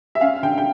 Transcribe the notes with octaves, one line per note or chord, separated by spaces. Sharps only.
E5
C#4 F5
D3 G5
G5